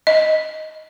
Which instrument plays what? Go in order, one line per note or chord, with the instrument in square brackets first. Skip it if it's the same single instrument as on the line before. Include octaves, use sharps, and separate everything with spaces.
[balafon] D#5